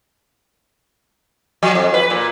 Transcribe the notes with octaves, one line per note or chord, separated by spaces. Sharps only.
F3
F2
B4
A#2